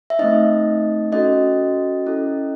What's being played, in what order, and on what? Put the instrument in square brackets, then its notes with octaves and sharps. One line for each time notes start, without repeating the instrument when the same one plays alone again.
[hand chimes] E5
A3 C4 D#4 D#5
C#4 F#4 A4 D#5
C#4 E4 A4